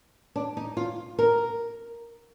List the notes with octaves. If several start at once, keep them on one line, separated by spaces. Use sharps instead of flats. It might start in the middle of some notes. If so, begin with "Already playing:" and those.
D4
D#4
F4
A#4